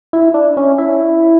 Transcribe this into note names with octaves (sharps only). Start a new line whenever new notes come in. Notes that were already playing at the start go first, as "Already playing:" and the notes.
E4
D4
C#4
E4